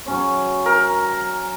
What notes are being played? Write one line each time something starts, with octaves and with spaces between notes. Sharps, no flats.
F#3 C#4 C#5
A#4